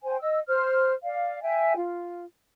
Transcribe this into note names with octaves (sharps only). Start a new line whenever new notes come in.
C5 G5 G#5
D#5 E6
C5 F6
D5 F5
E5 G5 G#5
F4